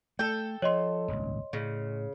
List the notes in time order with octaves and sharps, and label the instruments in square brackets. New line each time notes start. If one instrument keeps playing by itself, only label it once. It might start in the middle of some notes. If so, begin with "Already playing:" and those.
[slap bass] A3 [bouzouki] A4 G5
[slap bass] F3 [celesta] C#5 D#5 C6
[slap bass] D#1 G#1 C#2
[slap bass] A2 [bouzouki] C#3